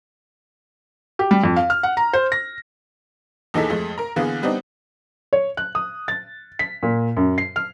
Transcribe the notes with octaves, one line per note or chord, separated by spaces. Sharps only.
G4
G3
F2
F5
F6
F#5
A#5
C5
A#6
D#2 E3 D#4 G#4 A4 B6
F2 G#3 A3
A#4 A#5
D3 E3 A#3 B3 G#4
G3 B3 C4 D4 D#4
C#5
F#6
D#6
A6
B6
A#2
F#2
C7
F6